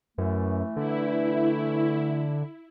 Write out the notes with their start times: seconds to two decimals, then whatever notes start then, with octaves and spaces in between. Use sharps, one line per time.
0.18 F#2 E3 A3
0.76 D3 E4